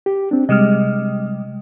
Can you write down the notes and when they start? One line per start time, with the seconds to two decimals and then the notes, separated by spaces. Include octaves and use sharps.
0.06 G4
0.31 C4 D4
0.49 C3 G3 G#3 D#5 F6